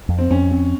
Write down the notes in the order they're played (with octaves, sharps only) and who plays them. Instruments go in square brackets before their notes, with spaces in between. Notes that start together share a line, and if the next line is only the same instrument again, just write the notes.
[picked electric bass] F2
[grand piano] C4
[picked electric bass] F2 [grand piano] C#4
[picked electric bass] C4